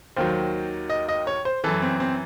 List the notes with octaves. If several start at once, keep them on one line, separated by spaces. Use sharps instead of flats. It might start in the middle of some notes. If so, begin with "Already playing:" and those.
D#2 D#3 F#3 C5
D#5
D#5
C#5
C5
F#2 E3 A4
C4
C4